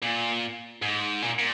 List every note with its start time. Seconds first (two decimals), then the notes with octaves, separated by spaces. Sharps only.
0.02 A#2
0.82 G#2
1.22 A#2
1.38 A#2